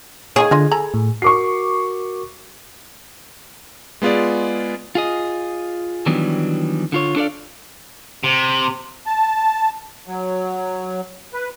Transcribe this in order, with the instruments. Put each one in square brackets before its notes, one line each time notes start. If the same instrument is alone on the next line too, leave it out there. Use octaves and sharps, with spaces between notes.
[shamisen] D#3 G3 C#5 [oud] G#4
[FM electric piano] D3 [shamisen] G#3 F4 D#5
[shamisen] A4 A#5 B5 [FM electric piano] G#5
[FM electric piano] A2
[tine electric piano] F#4 A#4 [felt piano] C#6 D6 C7
[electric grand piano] G#3 B3 F4 G#4 D5
[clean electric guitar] F4 G#4 D#5
D#3 E3 F#3 G3 B3 D4
D3 F4 C#5
D4 A4 B4 D5 F5
[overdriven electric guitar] C3
[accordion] A5
F#3
B4